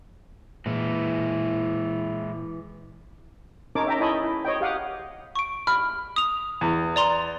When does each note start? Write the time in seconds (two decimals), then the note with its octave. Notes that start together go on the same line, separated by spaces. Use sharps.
0.66 A#2 E3 G#3 E4
3.75 C#4 D#4 A#4 C#5 A5 D6
3.87 E5 G5 A#5
4.00 E4 C#5 D#5 G#5 A5 B5
4.24 E4
4.45 C#5 D#5 G5
4.61 G4 F5 F#5 D#6
5.35 C#6 D7
5.67 B5 F6
6.16 D#6 F7
6.61 E2
6.96 D5 A#5 C6